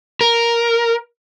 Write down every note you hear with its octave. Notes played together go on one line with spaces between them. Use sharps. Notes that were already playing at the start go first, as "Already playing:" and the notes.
A#4